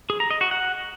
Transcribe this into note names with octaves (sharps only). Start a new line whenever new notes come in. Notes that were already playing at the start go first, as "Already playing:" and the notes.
G#4
A#5
D#5
F#4
F#5